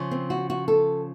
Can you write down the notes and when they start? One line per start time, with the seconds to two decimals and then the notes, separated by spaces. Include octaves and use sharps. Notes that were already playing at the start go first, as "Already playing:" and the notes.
Already playing: C#3 F3
0.11 C4
0.30 F#4
0.50 F#4
0.68 A4